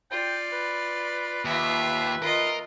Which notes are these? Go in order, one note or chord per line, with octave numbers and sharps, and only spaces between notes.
F4 D5 G5
B4
D#2 F4 E5
F4 A#4 D#5